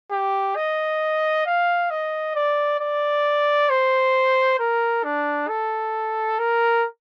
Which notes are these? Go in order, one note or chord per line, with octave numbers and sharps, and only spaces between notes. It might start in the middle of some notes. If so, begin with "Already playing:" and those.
G4
D#5
F5
D#5
D5
D5
C5
A#4
D4
A4
A#4